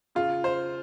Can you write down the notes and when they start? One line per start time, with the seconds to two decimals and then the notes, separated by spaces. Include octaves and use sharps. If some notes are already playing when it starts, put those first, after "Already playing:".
0.15 C#3 F4
0.44 C5